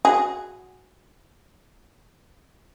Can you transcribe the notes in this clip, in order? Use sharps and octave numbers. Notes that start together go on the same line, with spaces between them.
F#4 G#4